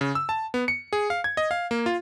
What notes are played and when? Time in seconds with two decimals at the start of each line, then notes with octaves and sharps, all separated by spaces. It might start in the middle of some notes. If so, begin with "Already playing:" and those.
0.01 C#3
0.15 E6
0.29 A5
0.54 B3
0.68 C#7
0.93 G#4
1.10 F5
1.24 G#6
1.37 D#5
1.51 F5
1.71 A#3
1.86 F4